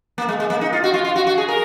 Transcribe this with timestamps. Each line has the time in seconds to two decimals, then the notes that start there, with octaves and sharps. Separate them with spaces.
0.18 A#3
0.29 G#3
0.40 G#3
0.50 A#3
0.61 D#4
0.73 F4
0.84 F#4
0.94 F4
1.05 F4
1.16 F#4
1.27 F#4
1.38 G#4
1.48 A#4